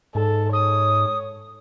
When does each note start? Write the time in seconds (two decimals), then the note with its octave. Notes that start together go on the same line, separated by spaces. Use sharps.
0.15 G#2 A4
0.53 C#5 D#6